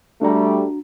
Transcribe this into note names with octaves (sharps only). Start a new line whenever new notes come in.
G3 A3 D4 F#4 A#5